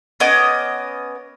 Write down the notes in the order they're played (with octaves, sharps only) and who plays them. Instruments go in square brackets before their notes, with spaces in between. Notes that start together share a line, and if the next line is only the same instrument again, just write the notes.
[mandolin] B3 C#4 D#5 D6